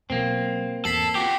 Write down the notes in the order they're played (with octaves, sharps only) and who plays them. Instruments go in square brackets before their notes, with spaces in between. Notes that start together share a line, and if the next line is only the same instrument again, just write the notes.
[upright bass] B2 F#3 [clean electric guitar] A#3 C4
[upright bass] E2 G#2 [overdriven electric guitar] A4 [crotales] B6 C7 F#7
[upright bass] C#4 [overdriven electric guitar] F#4 G4